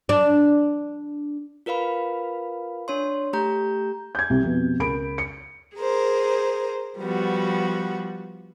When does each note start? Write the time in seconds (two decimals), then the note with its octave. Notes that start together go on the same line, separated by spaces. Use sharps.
0.09 D4
1.66 F4 A#4 B4 F5 B5
2.88 D4 C#5 C6
3.33 A3 G4 A#5 G6
4.15 G6 G#6
4.30 C2
4.43 F2 B2
4.79 C#2 A#4 B5 D7
5.18 C#7
5.76 G#4 A#4 C5
6.99 F3 G3 B3 F#4